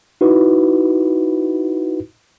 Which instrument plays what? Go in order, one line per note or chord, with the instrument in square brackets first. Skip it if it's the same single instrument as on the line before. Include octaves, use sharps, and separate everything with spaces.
[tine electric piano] D#4 E4 F#4 B4